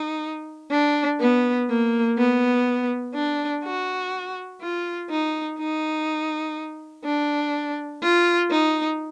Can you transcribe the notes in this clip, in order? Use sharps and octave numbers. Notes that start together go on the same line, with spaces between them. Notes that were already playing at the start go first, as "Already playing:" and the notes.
Already playing: D#4
D4
B3
A#3
B3
D4
F#4
F4
D#4
D#4
D4
F4
D#4